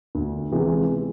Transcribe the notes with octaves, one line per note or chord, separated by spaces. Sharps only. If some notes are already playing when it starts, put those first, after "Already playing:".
D2
C3 E3 G#3 B3